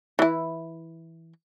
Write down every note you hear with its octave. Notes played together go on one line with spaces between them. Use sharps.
E3 E4